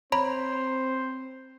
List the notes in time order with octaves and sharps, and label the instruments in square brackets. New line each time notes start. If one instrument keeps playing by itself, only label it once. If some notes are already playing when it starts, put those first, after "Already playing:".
[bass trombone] C4 [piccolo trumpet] C5 [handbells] C#5 A#5 B5